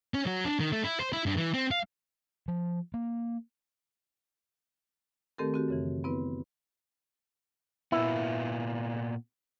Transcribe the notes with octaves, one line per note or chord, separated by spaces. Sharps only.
C#4
F#3
D4
D#3
A3
E4
C5
E4
G2
E3
C4
F5
F3
A#3
D#3 A3 C4 G4 A4 A#4
C4 F#4 G4
F#2 C#3 E3
B3 C4 E4 B4
A#2 A#3 B3 E4